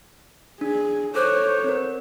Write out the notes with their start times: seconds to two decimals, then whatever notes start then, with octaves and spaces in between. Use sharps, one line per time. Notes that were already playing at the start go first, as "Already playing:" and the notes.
0.61 D4 G#4
1.15 A4 C5 C#5 D6 F#6
1.64 C4 A#4